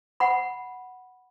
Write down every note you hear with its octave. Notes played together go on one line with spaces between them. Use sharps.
F#5 B5